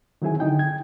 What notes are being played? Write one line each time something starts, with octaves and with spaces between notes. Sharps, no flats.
D#3 F#3 C4 E4 G#4 G#5
D3 D#4 G5
G#6